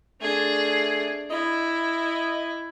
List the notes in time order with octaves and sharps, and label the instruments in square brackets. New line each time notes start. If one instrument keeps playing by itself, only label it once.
[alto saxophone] A3 [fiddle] D4 G#4
[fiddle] E4 [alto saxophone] D#5